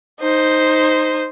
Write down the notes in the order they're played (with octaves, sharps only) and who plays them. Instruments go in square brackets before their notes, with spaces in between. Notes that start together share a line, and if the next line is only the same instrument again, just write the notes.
[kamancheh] D#4 C5